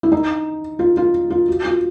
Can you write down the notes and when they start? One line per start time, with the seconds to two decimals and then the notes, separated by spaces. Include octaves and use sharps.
0.03 E4
0.12 D#4
0.79 F4
0.97 F4
1.30 F4
1.48 F#4
1.65 F4